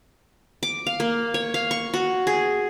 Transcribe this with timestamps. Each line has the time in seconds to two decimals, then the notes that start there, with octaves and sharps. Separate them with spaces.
0.63 D6
0.86 F5
1.00 A#3
1.34 C#5
1.54 F5
1.71 C#6
1.94 F#4
2.27 G#4